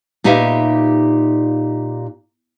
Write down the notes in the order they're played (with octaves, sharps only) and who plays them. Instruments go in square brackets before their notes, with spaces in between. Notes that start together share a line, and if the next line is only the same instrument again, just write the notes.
[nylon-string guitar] A#2 D#4 G4 B4 E5 F5